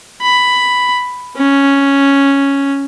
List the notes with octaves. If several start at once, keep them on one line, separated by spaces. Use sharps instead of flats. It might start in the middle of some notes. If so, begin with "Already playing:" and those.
B5
C#4